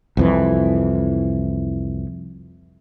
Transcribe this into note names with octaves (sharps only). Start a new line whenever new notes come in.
C2 F2 E3